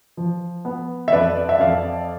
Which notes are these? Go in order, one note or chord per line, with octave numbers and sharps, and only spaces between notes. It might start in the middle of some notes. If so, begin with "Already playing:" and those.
F3
B3
E5
F2 B4 D5
D5
E5
F2 D5 F5